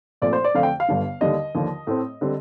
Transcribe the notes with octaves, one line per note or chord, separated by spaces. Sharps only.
A#1 A#2 A3 C4 D5
C5
D5
F2 D3 A3 C4 F5
G5
F5
G1 G2 D3
D#2 D3 G3 D#5
D#2 D3 F3
A2 A3 C4
D3 G3 C4